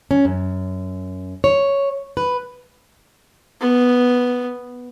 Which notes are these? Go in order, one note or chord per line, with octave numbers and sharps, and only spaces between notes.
C#4
F#2
C#5
B4
B3